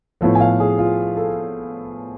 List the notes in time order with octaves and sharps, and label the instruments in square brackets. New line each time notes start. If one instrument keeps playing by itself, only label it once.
[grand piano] A2 F3 B3
G#5
F5
G#4
F4
A4